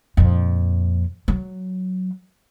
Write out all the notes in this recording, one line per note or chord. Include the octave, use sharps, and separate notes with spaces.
F2 A#2
F#3